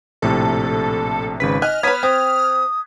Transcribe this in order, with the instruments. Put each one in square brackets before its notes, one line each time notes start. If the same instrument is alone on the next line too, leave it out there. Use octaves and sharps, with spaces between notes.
[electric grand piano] A#1 A2 C3 [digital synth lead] A4
[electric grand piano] G#1 C#3 B6 [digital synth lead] B4
[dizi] D#5 [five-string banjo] G#5 [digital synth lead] F6 [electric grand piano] F#6
[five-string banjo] B3 B4 [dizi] C#5 [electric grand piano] G#6 B6 D#7
[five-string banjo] C4 [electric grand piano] G5 [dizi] D#6